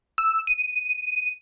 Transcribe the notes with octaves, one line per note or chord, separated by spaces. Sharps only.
E6
D#7